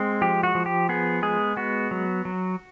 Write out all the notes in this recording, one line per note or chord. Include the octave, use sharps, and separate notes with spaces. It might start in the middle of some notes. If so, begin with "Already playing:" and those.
Already playing: G#3 C4
F3 G4
F#4
F3
G4
B3 G#4
G#3 G#4
B3 F#4
F#3
F#3